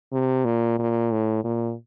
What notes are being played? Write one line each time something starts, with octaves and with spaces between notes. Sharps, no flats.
C3
A#2
A#2
A2
A#2